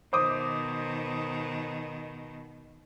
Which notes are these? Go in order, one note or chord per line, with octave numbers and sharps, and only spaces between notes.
B2 D#3 C5 D6 D#6